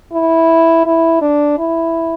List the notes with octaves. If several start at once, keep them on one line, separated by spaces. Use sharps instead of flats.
E4
E4
D4
E4